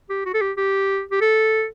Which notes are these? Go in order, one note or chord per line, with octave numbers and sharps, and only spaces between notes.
G4
F#4
A4
G4
G4
G4
A4